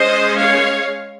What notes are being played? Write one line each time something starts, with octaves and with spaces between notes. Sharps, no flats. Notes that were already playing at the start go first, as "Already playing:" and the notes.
Already playing: G#3 C#4 C5 D#5
C#5 F5